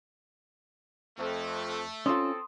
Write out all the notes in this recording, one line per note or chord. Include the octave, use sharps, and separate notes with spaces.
F2 A3
C4 C#4 F4 A4 C6 D#6